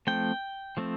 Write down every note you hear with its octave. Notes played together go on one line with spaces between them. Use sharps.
F3 A3 C4 G5
F3 A3 C4